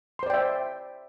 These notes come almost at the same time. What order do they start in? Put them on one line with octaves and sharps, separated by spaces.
C6 C5 D5 G5 E5